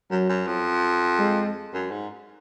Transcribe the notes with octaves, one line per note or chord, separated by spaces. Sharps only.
F#2 F#3
F#2
F2
G#3
F#2
G#2